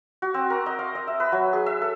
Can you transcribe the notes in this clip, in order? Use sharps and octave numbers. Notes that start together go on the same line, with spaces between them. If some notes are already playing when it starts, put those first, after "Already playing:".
F#4
C4
A#4
D#5
F5
D#5
E5
B4
F#3
G#4
E5
A4